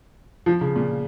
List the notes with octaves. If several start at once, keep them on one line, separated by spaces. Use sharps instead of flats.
F3
C#3
A#2